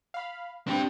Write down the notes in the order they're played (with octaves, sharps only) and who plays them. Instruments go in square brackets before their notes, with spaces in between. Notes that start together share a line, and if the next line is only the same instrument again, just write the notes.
[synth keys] F5 B5
[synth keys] C4 B5 G6 [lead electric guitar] D4 G4